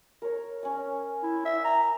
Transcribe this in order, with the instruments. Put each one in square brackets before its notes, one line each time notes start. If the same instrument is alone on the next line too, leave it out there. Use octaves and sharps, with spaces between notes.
[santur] A#4 C#5
C#4 G#5
[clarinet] E4
E5
A#5